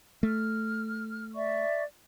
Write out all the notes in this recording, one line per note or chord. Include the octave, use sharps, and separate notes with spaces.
A3 F6
D5 E5 C#6